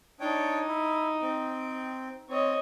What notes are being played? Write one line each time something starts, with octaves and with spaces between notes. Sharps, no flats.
D4 D#4 C#5 G5
E4
C4 G5
C4 C#5 D#5